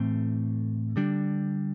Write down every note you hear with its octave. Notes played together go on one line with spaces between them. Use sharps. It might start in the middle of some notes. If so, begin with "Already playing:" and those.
Already playing: A2 E3 A3 C4
D3 G3 D4